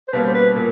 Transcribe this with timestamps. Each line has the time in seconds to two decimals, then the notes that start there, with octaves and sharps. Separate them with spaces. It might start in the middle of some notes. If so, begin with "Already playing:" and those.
0.08 C5
0.13 B2 G3 A#3 C#4 B4
0.24 C5
0.34 B4
0.56 A#2 A#4